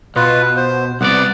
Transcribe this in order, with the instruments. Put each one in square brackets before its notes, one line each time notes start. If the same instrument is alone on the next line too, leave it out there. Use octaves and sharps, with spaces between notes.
[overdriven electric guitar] B2 [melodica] F4 B4
[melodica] C5
[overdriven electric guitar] C2 D5 [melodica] B3 F#5